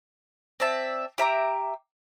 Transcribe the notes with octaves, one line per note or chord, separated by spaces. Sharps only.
C4 D5 E5 A5
G4 E5 A#5 D6